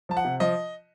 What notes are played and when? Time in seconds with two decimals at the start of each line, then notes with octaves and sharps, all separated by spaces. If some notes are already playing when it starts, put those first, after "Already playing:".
0.09 F3 A5
0.17 F#5
0.25 C3
0.40 F3 D#5